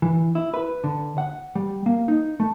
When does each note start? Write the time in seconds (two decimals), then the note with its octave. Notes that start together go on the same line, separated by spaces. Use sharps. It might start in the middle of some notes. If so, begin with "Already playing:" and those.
0.02 E3
0.35 E4
0.54 B4
0.84 D3
1.18 F#5
1.55 G3
1.86 A#3
2.08 D#4
2.40 A3